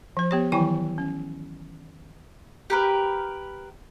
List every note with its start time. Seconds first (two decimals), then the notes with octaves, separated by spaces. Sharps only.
0.17 F3 C5
0.31 B3 G4 C#5
0.52 D#3 E3 F#3 E4 G5 G#5
0.98 C#4
2.70 G4 A#4 B4